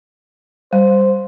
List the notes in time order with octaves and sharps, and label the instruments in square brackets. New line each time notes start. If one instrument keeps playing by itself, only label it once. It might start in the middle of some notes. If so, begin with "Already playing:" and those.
[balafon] G3 [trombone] C5